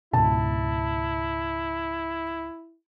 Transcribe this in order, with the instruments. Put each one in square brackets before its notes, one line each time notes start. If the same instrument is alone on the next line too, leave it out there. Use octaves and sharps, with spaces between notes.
[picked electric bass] C#2 G#2 B2 [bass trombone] E4 [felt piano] A5